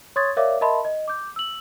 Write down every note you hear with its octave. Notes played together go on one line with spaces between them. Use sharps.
C#5 C6 C#6 D#6 G#6 A6
A#4 C#5 D5 E5 F5 D6
A#4 D#5 E5 A5 B5 C6
D#5
D6 G6
E6 F#7